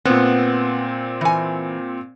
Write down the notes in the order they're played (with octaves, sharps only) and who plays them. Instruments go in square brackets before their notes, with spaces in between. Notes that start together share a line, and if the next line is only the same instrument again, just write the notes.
[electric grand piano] A#2 C4 [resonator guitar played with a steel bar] B3
[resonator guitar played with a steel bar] E3 G#5